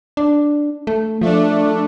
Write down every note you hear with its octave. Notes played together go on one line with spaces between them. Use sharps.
D4
A3
F3 A3 D4